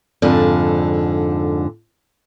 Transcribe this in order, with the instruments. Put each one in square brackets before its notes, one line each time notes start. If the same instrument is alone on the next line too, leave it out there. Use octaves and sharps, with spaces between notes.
[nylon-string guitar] F2 G#2 D3